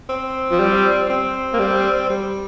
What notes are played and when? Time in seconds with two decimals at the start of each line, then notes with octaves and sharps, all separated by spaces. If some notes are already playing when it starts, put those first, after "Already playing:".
0.09 C4
0.51 F3
0.59 G3
1.10 C4
1.53 A#3
1.59 G3
2.10 G3